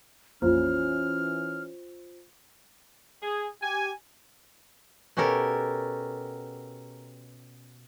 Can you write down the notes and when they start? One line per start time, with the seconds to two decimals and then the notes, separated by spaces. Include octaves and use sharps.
0.42 A#1 F2 E3 C#4 F4 C5 F6
3.22 G#4
3.62 G4 G#5
5.17 B2 C#4 G4 A4 A#4